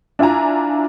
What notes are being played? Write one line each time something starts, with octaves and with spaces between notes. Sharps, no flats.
D4 E4 F4 G#5 A#5